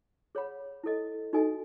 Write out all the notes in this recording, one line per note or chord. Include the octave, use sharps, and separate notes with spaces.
G#4 C#5 F#5 B5
E4 A4 D#5
D#4 F#4 A4 D#5 G#5